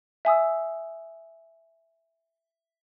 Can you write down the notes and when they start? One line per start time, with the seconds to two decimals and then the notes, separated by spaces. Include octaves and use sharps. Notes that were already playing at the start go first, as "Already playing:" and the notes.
0.25 E5 G#5 D#6 E6